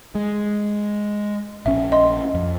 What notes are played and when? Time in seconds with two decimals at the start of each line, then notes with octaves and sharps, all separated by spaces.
0.15 G#3
1.66 A#1 C#4 E5
1.92 D#5 C6
2.34 F2